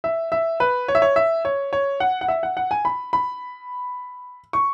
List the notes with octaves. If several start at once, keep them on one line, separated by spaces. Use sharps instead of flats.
E5
E5
B4
C#5
E5
C#5
E5
C#5
C#5
F#5
F#5
E5
F#5
F#5
G#5
B5
B5
C#6